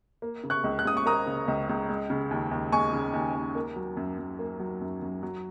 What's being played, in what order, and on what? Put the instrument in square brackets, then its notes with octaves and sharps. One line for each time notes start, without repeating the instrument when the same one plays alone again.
[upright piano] A#3
C#3
C#6 F#6
C#2
F#6
C#2 D#6
C#6
A#3 A#5 D#6
C#3
C#2
C#2
G#3
C#3
D#2
D#2
G#3 G#5 C#6
C#3
D#2
D#2
A#3
F#3
F#2
F#2
A#3
F#3
F#2
F#2
F#3